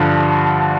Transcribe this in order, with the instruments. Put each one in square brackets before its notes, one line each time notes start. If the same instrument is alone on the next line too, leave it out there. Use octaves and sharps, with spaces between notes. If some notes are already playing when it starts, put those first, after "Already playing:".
Already playing: [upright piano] G2 D3 F3